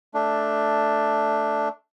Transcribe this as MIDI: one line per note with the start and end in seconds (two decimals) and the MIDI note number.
0.14 1.69 57
0.14 1.69 62